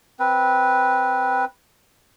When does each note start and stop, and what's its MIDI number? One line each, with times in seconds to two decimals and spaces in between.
0.19 1.45 60
0.19 1.45 71